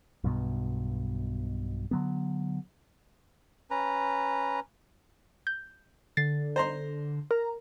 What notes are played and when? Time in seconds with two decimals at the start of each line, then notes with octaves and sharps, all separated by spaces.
0.24 B1 G2 B2
1.91 D3 F#3 B3
3.71 C#4 B4 A#5
5.47 G6
6.17 D3 A6 C7
6.56 C5 A#5 C6
7.31 A#4 A#5